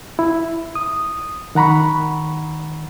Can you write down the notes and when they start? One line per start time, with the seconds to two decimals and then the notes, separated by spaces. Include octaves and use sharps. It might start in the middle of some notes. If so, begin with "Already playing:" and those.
0.19 E4
0.75 D#6
1.55 D#3 F#5 A#5 B5 C#6